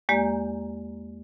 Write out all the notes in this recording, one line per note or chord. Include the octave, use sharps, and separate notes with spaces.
E2 G#3 A#3 G4 D5 A#5